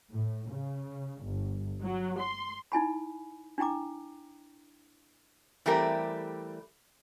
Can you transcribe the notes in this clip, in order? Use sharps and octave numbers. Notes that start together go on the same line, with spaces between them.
A2
C#3
G1
F#3
C6
D#4 E4 G#5 B5
D4 E4 G5 A#5 D6
E3 G3 A3 C4 G4 A#4